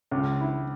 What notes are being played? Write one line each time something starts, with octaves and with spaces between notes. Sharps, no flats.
C#2
E4